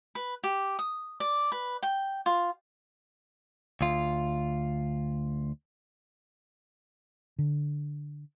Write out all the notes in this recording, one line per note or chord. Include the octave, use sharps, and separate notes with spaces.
B4
G4
D#6
D5
B4
G5
F4
D2 F4
D3